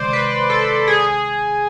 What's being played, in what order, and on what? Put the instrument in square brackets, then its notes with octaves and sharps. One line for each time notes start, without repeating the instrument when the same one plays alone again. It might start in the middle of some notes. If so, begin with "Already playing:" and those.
Already playing: [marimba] C3 D#3 G#3 [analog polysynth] C5 D5
[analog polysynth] B4
A4
G#4